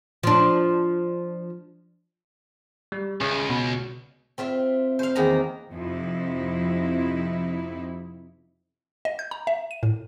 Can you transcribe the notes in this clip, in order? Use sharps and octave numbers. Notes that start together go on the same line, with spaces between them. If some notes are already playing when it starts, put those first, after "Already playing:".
F3 D4
G3
C#2 C#3
B2
C4 F4 E5
C5 F5
E2 D#3 A#3 A#5
F2 C3 D#4 E4
D#5
G6
A#5
E5
D#7
A2